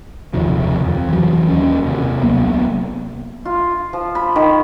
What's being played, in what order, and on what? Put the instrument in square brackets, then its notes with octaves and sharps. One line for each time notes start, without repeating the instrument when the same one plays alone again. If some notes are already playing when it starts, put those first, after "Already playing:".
[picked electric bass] F#1 D#2 C3 F3
F2
E3 F#3
D#2 C#4
D#2 C3
C2 F#3 A#3 B3
[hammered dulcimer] F4
F3
B5
D#3